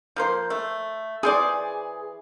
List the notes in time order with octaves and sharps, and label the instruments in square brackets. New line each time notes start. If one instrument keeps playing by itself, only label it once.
[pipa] F3 A#3 C5
A3
[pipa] E3 C5 D5 [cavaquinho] G#4